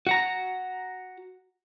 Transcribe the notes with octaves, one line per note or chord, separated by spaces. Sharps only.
F#4 F#5 A#5